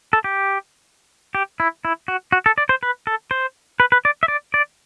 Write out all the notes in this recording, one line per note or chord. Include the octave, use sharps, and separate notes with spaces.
A4
G4
G4
E4
E4
F#4
F#4
A4
D5
C5
B4
A4
C5
B4
B4
D5
E5
D5
D5